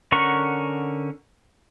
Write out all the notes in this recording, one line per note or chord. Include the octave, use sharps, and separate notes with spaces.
D3 C#4 A#4 F#5 C#6